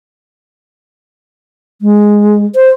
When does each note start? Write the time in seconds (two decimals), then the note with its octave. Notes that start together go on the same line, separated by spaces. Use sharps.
1.82 G#3
2.55 C5